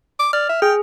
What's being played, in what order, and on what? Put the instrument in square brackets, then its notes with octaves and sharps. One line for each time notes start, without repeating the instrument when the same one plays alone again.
[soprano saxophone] D6
[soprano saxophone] D5 [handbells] F6
[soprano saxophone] E5
[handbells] G#4 [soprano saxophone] G5